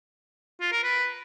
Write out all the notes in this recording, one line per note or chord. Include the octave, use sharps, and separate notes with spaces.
F4
A#4
B4